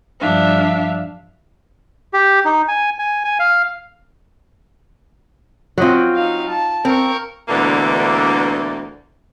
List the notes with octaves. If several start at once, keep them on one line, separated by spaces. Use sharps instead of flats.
G2 F3 D4 E5 F5
G4
D#4
G#5
G#5
G#5
F5
F#3 C4 F4 D#5 F#5
D#4 F5
A5
C4 A#4 C#6
D2 B2 D3 E3 A#3